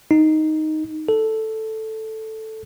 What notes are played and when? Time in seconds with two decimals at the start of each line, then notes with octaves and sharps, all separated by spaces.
0.11 D#4
1.09 A4